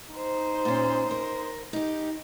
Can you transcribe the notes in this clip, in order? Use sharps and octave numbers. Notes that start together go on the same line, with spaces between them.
D#4 C5
A#2 C#4
A#4
D#4 G4